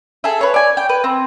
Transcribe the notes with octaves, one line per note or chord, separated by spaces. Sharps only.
G#4 A4 E5
B4 C#5
D5 G#5
G5
B4
C4